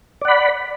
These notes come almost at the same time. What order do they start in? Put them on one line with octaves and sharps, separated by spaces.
D5 F#5 B5